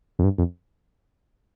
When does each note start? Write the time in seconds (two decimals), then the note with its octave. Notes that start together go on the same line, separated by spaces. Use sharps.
0.19 F2
0.24 G2
0.38 F2